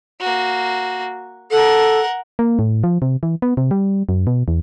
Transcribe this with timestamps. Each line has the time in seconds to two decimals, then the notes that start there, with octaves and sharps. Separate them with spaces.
0.20 A#3 F#4
1.51 A4 A#4 F#5
2.39 A#3
2.59 A2
2.84 F3
3.02 C3
3.23 E3
3.42 B3
3.57 C3
3.71 G3
4.09 F#2
4.27 B2
4.48 E2